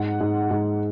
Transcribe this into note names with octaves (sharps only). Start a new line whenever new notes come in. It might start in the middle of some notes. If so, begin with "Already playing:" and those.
Already playing: G#2 F#5
G#2
G#2